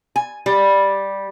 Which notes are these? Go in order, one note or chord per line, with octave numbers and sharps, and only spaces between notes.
G#5
G3